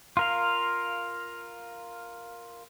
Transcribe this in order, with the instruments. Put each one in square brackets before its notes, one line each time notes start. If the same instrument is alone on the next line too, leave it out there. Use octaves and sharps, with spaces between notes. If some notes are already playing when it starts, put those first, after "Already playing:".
[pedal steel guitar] F4 A#4 F5